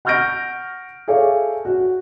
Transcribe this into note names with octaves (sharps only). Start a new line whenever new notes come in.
F#5 C#6 F6 G6 A#6 D7
G#4 A4 C#5 D5 E5 F5
F#4